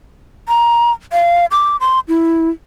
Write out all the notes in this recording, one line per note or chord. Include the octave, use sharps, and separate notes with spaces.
A#5
F5
D6
C6
E4